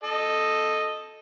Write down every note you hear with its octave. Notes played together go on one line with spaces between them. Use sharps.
A4 D#5